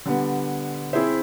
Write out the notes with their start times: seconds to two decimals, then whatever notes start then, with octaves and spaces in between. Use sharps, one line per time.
0.06 D3 G3 B3
0.93 C4 E4 G#4 C5 E5